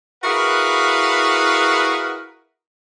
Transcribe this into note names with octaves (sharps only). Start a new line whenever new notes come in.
E4 F#4 G#4 A#4 B4 F5